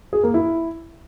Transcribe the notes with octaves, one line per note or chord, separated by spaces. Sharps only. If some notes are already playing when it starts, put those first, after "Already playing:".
G#4
A#3
E4